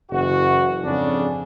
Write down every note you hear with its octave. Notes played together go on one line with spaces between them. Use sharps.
F#1 E3 F#4
F2 G#2 C#3 D4